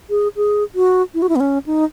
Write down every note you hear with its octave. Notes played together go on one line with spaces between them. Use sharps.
G#4
G#4
F#4
E4
F#4
E4
B3
C#4
D#4